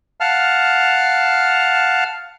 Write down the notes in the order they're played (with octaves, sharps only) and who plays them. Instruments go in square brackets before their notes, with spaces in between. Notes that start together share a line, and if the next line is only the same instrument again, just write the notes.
[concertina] F5 F#5 A5 F6